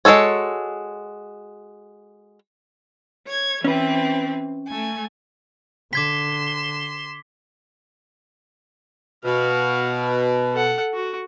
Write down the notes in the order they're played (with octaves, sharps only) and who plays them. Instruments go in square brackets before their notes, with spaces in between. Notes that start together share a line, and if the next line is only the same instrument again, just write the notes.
[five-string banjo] G#3 C4 F#4 A4 C#5
[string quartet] C#5 G#6
[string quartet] E3 C4 [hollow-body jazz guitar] C#4 B4
[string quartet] A3 G#5
[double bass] D3 [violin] C6 E7 [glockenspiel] D6 G#6 B6
[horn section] B2 [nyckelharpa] F#4 F5
[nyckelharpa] A4 F#5
F#4